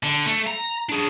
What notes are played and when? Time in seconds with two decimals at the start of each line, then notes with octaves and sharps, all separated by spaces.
0.03 D3
0.26 A3
0.47 A#5
0.89 D4 G#4